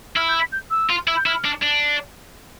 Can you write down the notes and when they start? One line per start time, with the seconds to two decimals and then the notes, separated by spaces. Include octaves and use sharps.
0.16 E4 F6
0.29 G6
0.40 B6
0.52 G6
0.71 E6
0.90 F4
1.08 E4
1.17 G6
1.26 E4 F6
1.45 D4
1.63 D4